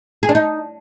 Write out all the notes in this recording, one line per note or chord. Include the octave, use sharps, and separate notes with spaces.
G#4
D4
D#4